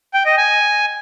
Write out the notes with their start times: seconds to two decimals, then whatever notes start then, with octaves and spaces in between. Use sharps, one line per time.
0.14 G5
0.26 D#5
0.37 G#5